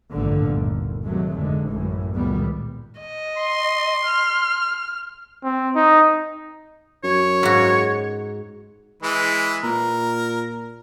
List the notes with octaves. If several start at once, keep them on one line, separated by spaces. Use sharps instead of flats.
A1 G2 A#2 D3 A3
G1 D#2
C3 D#3 F#3 G#3 A3
F1 G#2 D3 G#3
A1 F#2 A2 E3
C#2 A#2 D#3 F#3 G3 B3
D#5
C6
F6
C4
D#4
F#2 C#5
G#2 F#4
E3 G#3 B4
A#2 A#4